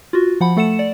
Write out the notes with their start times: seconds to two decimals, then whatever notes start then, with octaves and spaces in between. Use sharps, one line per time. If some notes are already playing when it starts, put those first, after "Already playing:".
0.13 F4 F#4
0.40 F3 F#5 B5
0.57 A3 A4 F#5 C#7 E7
0.79 D5